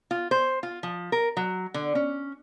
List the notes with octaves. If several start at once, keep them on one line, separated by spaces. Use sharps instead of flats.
F4
C5
F4
F3
A#4
F#3
D3
C#4